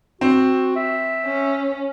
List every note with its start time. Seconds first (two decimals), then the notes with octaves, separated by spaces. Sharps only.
0.21 C4 F#4
0.76 E5
1.25 C#4